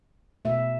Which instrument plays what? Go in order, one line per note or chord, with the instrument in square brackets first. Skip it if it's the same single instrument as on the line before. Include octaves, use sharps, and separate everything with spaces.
[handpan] B2 A3 E5